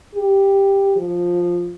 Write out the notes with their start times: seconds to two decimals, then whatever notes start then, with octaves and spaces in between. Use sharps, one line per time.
0.15 G4
0.96 F3